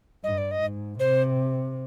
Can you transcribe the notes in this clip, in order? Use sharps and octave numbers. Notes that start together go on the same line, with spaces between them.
G2 D#5
D5
D#5
G#2
C3 C5